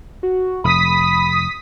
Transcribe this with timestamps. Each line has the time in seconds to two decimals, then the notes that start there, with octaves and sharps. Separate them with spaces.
0.23 F#4
0.64 F1 F2 B5 D#6 B6